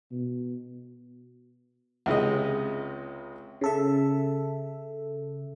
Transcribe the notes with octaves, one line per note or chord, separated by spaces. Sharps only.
B2
C#2 C3 G#3 D#5
C#3 A4 E5